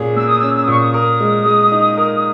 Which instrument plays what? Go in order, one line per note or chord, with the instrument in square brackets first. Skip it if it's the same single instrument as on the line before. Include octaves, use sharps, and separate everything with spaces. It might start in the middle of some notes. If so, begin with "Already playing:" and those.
Already playing: [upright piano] A#2 C#4 G#4
[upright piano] A#3 [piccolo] E6
[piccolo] D#6
[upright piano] C#4 [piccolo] E6
[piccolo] E6
D#6
[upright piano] A#2 [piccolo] C#6
[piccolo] D#6
[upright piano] A#4 [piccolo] D#6
[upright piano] G#3
G#3
D#4
A#4